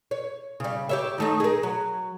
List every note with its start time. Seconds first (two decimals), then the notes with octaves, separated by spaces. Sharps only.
0.11 C#5
0.60 C#3 G3
0.89 G4 C#5 E5
1.18 D#3 A3 D#4
1.40 G#4 A#4
1.63 F#3